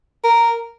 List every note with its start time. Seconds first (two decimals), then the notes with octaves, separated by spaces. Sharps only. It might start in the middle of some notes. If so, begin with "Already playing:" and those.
0.24 A#4